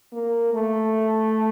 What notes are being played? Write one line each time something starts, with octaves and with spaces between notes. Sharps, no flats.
A#3
A3